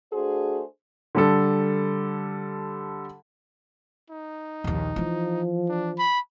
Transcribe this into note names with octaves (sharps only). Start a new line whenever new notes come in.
A3 D4 F#4 G#4 C5
D3 G3 A4
D#4
A#1 D#2
E3 F3 B3
D4
B5